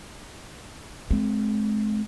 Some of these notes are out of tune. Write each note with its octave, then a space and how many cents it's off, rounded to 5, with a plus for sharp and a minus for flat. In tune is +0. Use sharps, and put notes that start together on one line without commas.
G#3 +40 C4 +0